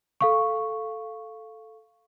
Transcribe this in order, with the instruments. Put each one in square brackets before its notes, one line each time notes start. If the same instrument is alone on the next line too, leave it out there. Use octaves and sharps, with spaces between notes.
[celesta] A4 F5 C#6